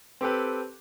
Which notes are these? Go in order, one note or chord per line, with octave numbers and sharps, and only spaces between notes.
C4 G4 A4 B4